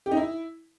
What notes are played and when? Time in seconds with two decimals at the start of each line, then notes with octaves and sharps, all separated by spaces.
0.06 G4
0.11 D#4
0.17 E4